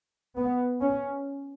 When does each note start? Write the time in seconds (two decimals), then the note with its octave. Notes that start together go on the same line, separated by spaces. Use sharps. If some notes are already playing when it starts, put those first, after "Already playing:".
0.37 B3
0.82 C#4